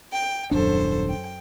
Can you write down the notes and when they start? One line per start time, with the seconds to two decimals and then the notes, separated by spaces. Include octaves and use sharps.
0.12 G5
0.51 D#1 F#2 D4 A4 C5
1.08 G5